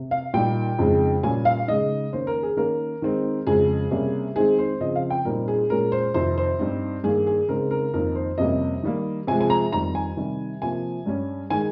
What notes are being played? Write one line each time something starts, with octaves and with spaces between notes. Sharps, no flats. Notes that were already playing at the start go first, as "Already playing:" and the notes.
Already playing: C3
F5
A#2 G3 A#3 D#4 G5
F2 C#3 G#3 D#4
A#2 G3 A#3 C#4 G#5
F5
C#3 G#3 D#4 D#5
D#3 A#3 C#4 C5
A#4
G#4
D#3 A#3 C#4 A#4
D#3 G#3 C4 D#4
F2 C#3 G#3 G#4
C3 G3 A#3 C#4
D#3 G#3 C4 D#4 G#4
C5
C#3 F3 C4 D#5
F5
G5
A#2 G3 C4 D#4 A#4
G#4
A#2 G#3 C#4 A#4
C5
F2 C3 D#3 C5
C5
G2 G3 C4 D#4
G2 D#3 A#3 G#4
G#4
C#3 G#3 C4 D#4 A#4
A#4
F2 D#3 A#3 D#4 A#4
C5
F2 C3 G3 A#3 C#4 D#5
D#3 G3 A#3
C3 F3 G#3 G#5
G#5
A#5
F2 D#3 G3 A#5
G#5
C3 D#3 G3
C3 F3 A#3 G#5
G2 G3 C#4
D#3 G#3 D#4 G#5